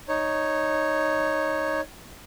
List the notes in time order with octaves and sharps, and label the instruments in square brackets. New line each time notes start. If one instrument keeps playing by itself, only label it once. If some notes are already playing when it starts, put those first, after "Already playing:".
[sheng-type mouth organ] D#4 C#5